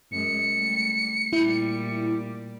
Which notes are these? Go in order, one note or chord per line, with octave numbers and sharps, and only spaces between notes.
F#2 G#3 C#7
G3 A3
A#2 G3 E4